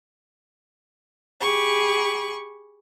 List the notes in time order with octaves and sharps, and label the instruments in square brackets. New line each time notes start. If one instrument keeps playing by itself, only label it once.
[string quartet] G4 G#4 B5 C#6